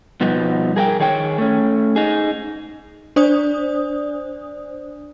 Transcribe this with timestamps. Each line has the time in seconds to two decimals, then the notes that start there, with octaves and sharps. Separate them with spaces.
0.21 B2 F3 G3 B3 D#4
0.76 G#4 A#4 F#5 G5
1.00 D#3 G#4 C#5 G5
1.38 A3 C#4
1.96 D#4 G#4
3.16 D4 C5 D5 D#6